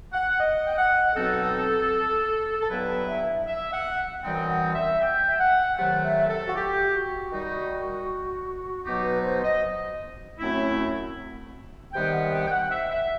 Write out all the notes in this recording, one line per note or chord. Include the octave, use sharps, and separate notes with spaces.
F#5
D#5
G5
F#5
B2 F#3 C4 D#4 A4
A4
G2 F#3 B3 E4 B4
E5
E5
F#5
F#2 E3 G3 C4 D#4 G5
F#5
E5
G5
E5
F#5
C3 D#3 F#3 A3 F#5
E5
A4
F#4
G4
F#4
D#3 G3 D#4
B2 F#3 B3 D#4 G4
B4
C5
D#5
F#2 F#3 A3 C4 E4
C3 D#3 G3 B3 D#4 G5
F#5
G5
G5
F#5
E5
E5